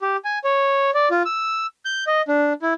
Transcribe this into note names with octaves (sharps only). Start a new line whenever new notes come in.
G4
G#5
C#5
D5
F4
E6
G6
D#5
D4
E4